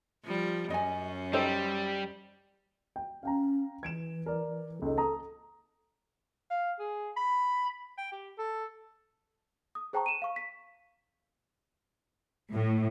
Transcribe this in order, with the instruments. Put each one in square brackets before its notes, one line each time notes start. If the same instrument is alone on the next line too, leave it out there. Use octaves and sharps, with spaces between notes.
[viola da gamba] F3 G3
[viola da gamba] F#2 C#4 [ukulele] D#5 G#5
[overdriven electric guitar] G3 [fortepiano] D#4 A4 C5 [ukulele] G4
[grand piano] G5
[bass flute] C#4 [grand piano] F5 G5 A#5
[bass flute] E3 [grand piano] G#6 D7 E7
[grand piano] A#4 D5
[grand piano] C#2 D#4 [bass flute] A4
[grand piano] A5 A#5 D#6
[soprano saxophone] F5
G#4
B5
G5
G4
A4
[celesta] D#6
G#4 C5 G5 A5 A#5 C#6
D#7 E7
F5 C#6
B6
[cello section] A2